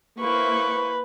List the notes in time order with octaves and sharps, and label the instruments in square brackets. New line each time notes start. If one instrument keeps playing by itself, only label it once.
[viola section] A#3 E4 C5 [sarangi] B4 [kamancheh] C#6